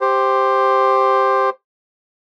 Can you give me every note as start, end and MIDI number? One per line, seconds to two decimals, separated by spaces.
0.01 1.50 67
0.01 1.50 72